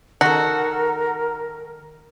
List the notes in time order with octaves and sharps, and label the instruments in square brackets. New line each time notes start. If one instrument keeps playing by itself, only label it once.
[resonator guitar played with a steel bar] D#3 A4 [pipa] F#4 [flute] A#4